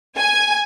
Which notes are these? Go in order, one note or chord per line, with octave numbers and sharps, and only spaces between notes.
G#5